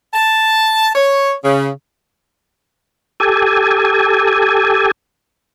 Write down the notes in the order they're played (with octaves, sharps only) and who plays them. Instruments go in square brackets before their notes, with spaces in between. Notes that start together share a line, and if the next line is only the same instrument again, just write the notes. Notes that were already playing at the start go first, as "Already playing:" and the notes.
[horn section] A5
C#5
C#3
[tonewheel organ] G4 A4 G#5